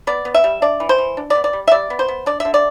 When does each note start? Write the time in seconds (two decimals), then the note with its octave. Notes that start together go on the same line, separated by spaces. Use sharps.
0.07 B3 D5
0.25 B3
0.34 E5
0.44 G3
0.62 D4 D5
0.80 E3
0.89 C5
0.98 E3
1.17 D4
1.30 D5
1.35 B3
1.44 D5
1.53 G3
1.68 E5
1.71 G3 D5
1.90 B3
1.99 C5
2.08 B3
2.26 D4 D5
2.40 E5
2.45 D3
2.54 D5